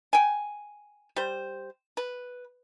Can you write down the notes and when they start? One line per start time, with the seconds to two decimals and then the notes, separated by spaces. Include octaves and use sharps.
0.13 G5 G#5
1.16 G3 C5
1.97 B4